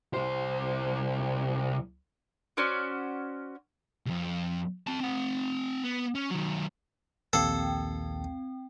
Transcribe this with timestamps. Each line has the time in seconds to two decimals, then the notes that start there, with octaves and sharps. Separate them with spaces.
0.14 C2 C5
2.57 C#4 F#4 C5 D5
4.06 C2 F2
4.87 C4 A5
5.00 C4 F#5
5.84 B3
6.15 C#4
6.31 D#3 F#3
7.33 A#1 D#2 C4 A4 G5